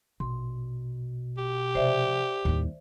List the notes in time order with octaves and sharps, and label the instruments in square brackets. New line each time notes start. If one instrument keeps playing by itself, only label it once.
[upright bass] A#1 [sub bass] B2 [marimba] C6
[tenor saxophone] G4
[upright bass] C3 F3 [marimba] C5 D5 E5
[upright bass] D#2 G3 [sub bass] A2